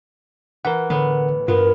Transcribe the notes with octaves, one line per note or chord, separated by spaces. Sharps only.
E3 A#4 F#5
A2 D3 B3
G2 B3 F4 A#4